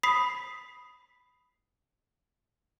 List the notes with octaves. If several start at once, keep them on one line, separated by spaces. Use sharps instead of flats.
B5 D#6 B6 C7